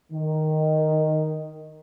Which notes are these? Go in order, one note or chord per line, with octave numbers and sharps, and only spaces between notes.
D#3